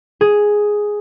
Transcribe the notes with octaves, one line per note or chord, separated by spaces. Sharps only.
G#4